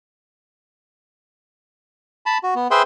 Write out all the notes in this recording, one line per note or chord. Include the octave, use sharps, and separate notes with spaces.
A5 B5
F#4
B3
G#4 B4 C5 E5 G5 C6